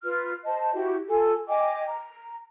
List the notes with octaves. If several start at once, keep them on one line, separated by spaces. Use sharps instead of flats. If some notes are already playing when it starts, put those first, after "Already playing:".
F4 B4 F6
C5 D#5 A5
E4 F#4 G4
F4 A4 G#5
D#5 G5 G#5 D6
A#5